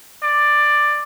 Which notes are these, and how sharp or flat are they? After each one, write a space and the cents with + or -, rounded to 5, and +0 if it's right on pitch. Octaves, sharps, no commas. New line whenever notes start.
D5 +10